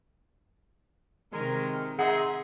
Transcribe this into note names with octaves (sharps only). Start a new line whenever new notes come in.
C3 D#3 G#3 A#4
D#4 G#4 E5 F#5 C6